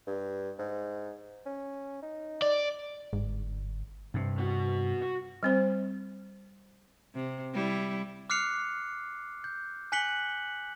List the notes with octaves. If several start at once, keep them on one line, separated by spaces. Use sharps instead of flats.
G2
G#2
C#4
D#4
D5
G1 G#2
G2 C3
B2 F#4
F#4
G3 C4 C5
C3
G3 E4
D6 F6 F#6 C7 C#7 F7
G6
G#5 F#6 B6 C#7 F#7 G7